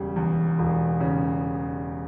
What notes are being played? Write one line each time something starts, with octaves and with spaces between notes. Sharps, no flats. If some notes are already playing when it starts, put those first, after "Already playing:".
Already playing: E1 C#3 G3
E2
E1
C#3